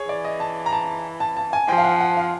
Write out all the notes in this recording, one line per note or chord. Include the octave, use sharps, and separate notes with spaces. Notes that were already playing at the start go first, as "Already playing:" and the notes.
Already playing: G#4 C#5
E3 D5
D#5
A5
A#5
A5
A5
A5
G#5
F3 G5
F5
F#5
F#5
F5